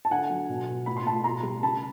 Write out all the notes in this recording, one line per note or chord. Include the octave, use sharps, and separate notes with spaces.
A5
D3 F#5 G#5
F#3
B2
B2
A2 B5
C6
A2 A5 B5
B2 A#5 C6
G3
C#3 A5 B5